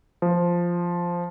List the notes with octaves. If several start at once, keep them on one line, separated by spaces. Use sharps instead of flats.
F3